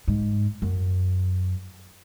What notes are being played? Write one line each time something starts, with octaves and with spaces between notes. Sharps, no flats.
G#2
F#2